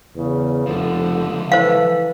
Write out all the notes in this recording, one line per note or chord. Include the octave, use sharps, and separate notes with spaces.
E2 C#3
F1 C#2 D3 F3
E3 A4 C5 F5